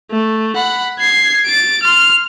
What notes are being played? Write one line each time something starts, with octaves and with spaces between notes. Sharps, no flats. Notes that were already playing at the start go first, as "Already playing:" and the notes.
A3
F#5 B5
G#6 C7
A6 D7
C6 F6